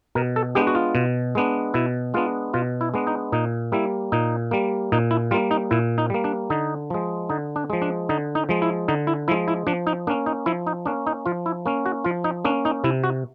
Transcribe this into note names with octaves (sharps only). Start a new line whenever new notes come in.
B2 A#4
A4
G#3 B3 D4 G4
F#4
F4
B2
G#3 B3 D4
B2 E4
G#3 B3 D4 F4
B2 F4
E4
G#3 B3 D4
D#4
A#2 D#4
G3 A#3 E4
A#2 D#4
G3 A#3
A#2 D#4
E4
G3 A#3 F4
D#4
A#2 E4
D#4
G3 A#3
D4
D3 D#4
F3 G#3
D3 D#4
D4
F3 G#3
D4
D3 D#4
D#4
F3 G#3
E4
D3 D#4
E4
F3 G#3 E4
E4
F3 D4
D#4
A#3 C#4 D4
D#4
F3 E4
D#4
A#3 C#4 D4
D#4
F3 F4
E4
A#3 C#4
F#4
F3 F4
D#4
A#3 C#4 D4
D#4
C3 E4
F#4